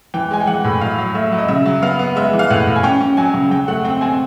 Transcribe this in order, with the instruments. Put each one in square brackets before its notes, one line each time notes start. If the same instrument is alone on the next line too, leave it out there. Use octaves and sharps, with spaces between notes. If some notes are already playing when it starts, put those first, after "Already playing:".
[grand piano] E3 G5
G#3 G#5
G5
E3 F#5
A2
F#3 F5
F#3
A3 E5
F#3
D#5
C#3 E5
F#3
B3 F5
B3
G#3 E5
E3
F5
A2 F#5
A2
G#5
C#4 G5
C#4
F#3 G#5
C#3
F#3 G5
A3 F#5
C4 G5
C4 G#5